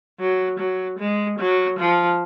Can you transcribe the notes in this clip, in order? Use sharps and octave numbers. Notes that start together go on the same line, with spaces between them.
F#3
F#3
G#3
F#3
F3